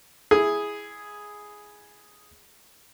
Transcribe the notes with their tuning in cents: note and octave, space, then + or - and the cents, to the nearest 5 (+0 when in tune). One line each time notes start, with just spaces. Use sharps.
E4 +0 G#4 +0